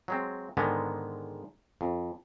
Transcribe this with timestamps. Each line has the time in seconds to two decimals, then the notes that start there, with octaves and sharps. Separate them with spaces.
0.08 F#3 G#3 C4
0.57 G#2 D3 D#3 G#3 B3
1.81 F2